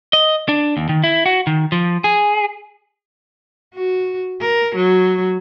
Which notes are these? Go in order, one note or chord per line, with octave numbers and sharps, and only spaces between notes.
D#5
D4
D#2
D#3
E4
F#4
D#3
F3
G#4
F#4
A#4
F#3